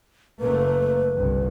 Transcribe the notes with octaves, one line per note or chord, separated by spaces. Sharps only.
F#1 A3 A#3 B4
G1 C2